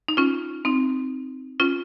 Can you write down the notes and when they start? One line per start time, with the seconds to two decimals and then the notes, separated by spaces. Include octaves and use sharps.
0.08 D#4
0.17 C#4 F4
0.65 C4 D#4
1.60 C#4 F4